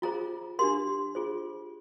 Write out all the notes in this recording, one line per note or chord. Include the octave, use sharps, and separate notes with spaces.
F4 G#4 C5 A#5
D4 G4 A#4 C6
F4 G#4 C5